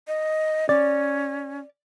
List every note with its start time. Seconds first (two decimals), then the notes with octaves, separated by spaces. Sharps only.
0.07 D#5
0.69 C#4 D5